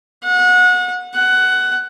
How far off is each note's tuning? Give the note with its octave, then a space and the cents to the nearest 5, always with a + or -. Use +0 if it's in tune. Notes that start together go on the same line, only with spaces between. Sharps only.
F#5 -30
F#5 +15